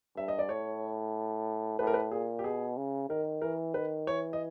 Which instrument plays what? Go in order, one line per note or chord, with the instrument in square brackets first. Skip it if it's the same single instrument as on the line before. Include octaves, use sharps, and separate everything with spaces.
[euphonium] G2 [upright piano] E5
[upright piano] D#5
D5
[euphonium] A2 [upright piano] C#5
[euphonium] A2 [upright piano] B4
[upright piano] A#4
B4
[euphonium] A#2 [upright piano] G#4
[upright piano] G4
[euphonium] B2 [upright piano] G#4
[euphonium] C#3
[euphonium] D#3 [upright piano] A#4
[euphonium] E3 [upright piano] A#4
[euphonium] D#3 [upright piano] B4
[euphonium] E3 [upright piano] C#5
[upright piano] D#5